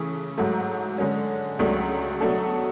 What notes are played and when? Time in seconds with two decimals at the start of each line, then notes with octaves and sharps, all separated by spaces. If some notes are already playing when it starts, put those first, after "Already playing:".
Already playing: C#3 E3 A3
0.38 G#2 F#3 A3
0.98 D3 G#3 C#4
1.59 C#2 C#3 F#3 A3 D4
2.21 B2 F#3 A3 D4 A4